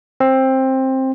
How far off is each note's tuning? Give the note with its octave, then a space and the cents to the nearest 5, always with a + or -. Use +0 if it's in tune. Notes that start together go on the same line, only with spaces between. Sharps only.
C4 +15